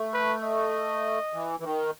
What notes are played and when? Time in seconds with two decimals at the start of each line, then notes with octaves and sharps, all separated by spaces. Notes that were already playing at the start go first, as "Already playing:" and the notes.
Already playing: A3
0.13 B4
0.43 D#5
1.33 E3
1.60 E3
1.64 D#3